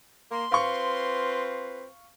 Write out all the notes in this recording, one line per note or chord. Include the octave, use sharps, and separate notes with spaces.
A#3 C6
C4 F4 B4 F5 C#6